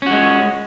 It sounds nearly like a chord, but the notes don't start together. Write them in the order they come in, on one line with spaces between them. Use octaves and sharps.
C#4 F#4 G#3